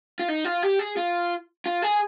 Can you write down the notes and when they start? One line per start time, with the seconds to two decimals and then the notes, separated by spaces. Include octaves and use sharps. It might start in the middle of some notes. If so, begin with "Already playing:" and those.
0.19 F4
0.28 D#4
0.45 F4
0.63 G4
0.79 G#4
0.97 F4
1.66 F4
1.82 G#4